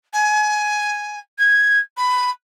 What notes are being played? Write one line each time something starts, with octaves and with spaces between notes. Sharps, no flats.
G#5
G#6
B5